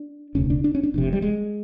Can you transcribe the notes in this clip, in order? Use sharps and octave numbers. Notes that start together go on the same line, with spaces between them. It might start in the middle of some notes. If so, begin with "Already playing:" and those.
Already playing: D4
E1 D2 C#3 C#4
D4
D4
C#4
D4
F1 F2 C3
G3
G#3